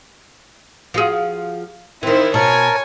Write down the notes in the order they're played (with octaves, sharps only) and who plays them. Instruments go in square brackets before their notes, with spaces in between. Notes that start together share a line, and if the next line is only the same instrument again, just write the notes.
[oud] F3 F#4 G#4
[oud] D#3 E3 [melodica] C4 [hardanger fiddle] E4 C5
[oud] B2 [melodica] A#4 A5 [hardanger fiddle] C#5 G#5